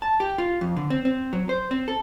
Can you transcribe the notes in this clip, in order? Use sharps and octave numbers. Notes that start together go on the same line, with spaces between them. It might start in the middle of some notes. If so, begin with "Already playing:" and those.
A5
G4
F4
F2
D3
C4
C4
F#3
C5
C4
A4